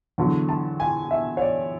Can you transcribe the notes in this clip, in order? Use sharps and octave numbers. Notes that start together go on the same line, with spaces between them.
E2 D3 F#3
A5
G#5
E5
C#5
D5